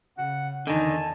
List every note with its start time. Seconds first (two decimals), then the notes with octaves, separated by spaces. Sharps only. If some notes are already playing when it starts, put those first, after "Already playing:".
0.18 C#3 F#5
0.67 E2 D3 D#3 D#4 G#5 A5